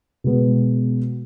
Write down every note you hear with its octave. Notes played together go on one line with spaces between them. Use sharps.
B2 G#3 B3